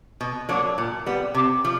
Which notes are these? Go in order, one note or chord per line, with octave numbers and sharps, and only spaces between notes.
B2
F#3 A#3 D4
A#2
G3 B3
C3
F3